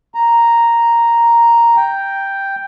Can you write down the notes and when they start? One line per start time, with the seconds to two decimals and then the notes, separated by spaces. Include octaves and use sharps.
0.15 A#5
1.76 G5